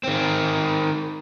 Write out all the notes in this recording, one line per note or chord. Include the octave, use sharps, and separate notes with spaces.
D#3 C4